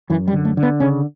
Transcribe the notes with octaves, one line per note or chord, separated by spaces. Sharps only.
F#2 E3
G3
D3
A3
D3
B3
C#3 C#4